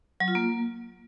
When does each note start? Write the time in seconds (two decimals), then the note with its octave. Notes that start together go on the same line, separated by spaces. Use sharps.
0.20 F#3
0.28 F4
0.35 A#3